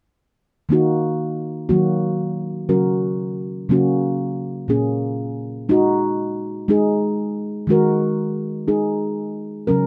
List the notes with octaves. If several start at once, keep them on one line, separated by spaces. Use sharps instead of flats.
D#3 A#3 D#4 F#4
D#3 F#3 A#3 F#4
C#3 F#3 C#4 F#4 A#4
C#3 F#3 A#3 C#4 F#4
A#2 A#3 C#4 G#4
G#3 D#4 F#4
G#3 D#4 G#4
D#3 G#3 F#4 A#4
G#3 D#4 G#4
C#3 F#3 C#4 A#4